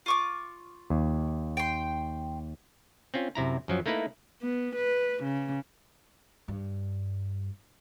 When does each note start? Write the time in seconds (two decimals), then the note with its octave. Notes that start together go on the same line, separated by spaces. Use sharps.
0.06 F4 C#6 D6
0.90 D#2
1.57 G5 C6
3.14 C4 C#4 F4
3.35 F#2 C3 E4 A#5
3.68 F#2 F3 F#3
3.86 A3 A#3 D#4 E4 B4
4.42 B3
4.76 B4
5.24 C#3
6.48 G2